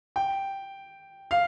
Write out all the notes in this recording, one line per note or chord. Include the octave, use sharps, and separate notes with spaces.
G5
F5